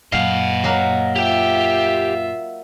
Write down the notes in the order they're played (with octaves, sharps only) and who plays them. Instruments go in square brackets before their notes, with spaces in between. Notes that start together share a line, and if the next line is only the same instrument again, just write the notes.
[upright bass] F#2 A#2 [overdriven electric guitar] D#5 F#5 [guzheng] F5
[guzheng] F#3 A#3 A#4
[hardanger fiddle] F4 E5 [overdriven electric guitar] G4 G5